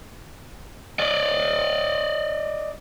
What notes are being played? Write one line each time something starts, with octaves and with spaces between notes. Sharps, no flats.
D5 D#5